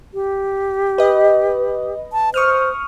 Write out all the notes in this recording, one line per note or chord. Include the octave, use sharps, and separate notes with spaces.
G4
B4 D#5
A5
C5 C#6 D#6 F6